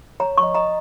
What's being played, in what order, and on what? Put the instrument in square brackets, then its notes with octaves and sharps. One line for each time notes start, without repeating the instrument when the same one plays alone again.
[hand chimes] C#5 [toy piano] A#5
[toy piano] C#6
[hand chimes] D#5
[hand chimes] D#5 [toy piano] A#5